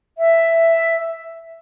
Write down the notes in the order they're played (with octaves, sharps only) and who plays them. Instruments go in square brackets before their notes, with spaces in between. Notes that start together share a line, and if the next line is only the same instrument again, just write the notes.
[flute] E5